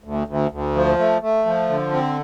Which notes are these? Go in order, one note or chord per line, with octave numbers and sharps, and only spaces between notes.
D2
D2
D2
F3
A3
A3
F3
D3
C4